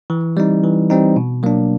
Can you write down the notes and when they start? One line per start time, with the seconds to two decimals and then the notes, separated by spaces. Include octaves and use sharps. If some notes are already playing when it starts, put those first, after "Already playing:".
0.10 E3
0.37 G3 C4 D#4
0.64 E3
0.90 G3 C4 D#4
1.16 B2
1.43 F#3 A#3 D4